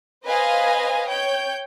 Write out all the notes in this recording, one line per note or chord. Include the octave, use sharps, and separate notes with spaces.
B4 C5 D#5 F5 G#5
C#5 G5 G6